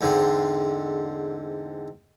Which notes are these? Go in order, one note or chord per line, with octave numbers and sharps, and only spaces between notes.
E2 G#2 D3 C4